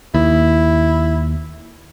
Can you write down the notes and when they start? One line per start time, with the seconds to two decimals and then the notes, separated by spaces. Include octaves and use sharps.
0.14 D#2 E4